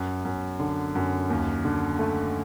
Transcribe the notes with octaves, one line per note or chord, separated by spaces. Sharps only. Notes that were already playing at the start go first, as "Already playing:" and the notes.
Already playing: F#2
F#2
D3
F#2
D#2
D3
A3